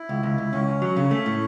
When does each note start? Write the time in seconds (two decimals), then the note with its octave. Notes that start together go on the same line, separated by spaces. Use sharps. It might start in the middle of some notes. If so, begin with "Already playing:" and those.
Already playing: E4
0.09 C#2
0.23 C#2
0.38 C#2
0.52 C#2 C#4
0.67 C#2
0.82 F#3
0.97 C#3
1.11 A3
1.26 A2